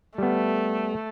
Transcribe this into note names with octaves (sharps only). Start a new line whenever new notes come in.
G3 A3 B3